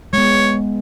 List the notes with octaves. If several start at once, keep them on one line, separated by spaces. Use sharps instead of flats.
G#3 B3 C#5